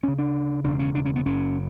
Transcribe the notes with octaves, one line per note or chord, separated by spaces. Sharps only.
D2 C#3 C#4
D4
E1 D2 C#3 D4
C#4
D4
C#4
B3
F#1 F#2 C#3 C#4